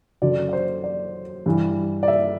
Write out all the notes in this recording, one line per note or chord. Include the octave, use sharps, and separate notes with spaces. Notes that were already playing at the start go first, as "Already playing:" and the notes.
F#2 D3 F#3 D5
D5
C5
D5
G2 E3
D5
E5